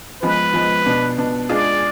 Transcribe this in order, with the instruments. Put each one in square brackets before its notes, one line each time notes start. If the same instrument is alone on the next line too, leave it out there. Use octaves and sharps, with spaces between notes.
[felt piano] F3 G#3 B3 [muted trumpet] B4
[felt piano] F3 G#3 B3
B2 B3 D4
B2 B3 D4
[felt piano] G#3 D4 F4 G#4 [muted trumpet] D5